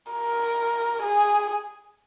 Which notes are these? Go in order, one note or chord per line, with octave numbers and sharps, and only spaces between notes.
A#4
G#4